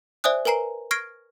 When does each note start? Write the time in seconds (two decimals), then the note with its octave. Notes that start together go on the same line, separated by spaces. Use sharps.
0.24 C5 D5 E5 G#5 D#6 F#6
0.45 A#4 B4 G#5 A#5 C7
0.91 C#6 F6 G#6 A#6 C7 D7